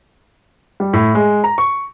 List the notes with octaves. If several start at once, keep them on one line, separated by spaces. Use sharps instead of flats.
G3
A2
G#3
A#5
C#6